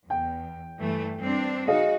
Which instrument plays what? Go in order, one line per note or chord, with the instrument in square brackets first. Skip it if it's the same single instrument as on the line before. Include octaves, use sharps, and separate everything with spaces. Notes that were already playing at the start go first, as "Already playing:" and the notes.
[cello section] E2 [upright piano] G5
[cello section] G2 E3 A3
G2 C4 D4
[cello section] D#4 F#4 [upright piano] G#4 D#5 F5